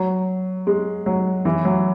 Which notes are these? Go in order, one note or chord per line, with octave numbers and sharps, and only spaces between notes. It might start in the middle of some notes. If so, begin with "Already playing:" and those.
Already playing: F#3
G#3
F#3
E3
F#3